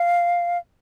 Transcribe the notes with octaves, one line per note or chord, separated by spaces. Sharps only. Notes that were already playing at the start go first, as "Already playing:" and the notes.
Already playing: F5